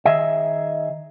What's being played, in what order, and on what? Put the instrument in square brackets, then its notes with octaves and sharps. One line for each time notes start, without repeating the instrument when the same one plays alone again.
[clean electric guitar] D#3 G#4 D#5 E5